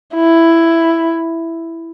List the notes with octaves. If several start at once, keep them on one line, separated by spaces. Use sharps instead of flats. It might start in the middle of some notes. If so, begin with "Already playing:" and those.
E4